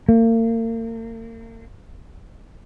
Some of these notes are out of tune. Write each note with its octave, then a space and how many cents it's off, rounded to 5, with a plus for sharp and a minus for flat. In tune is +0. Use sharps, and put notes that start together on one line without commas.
A#3 -40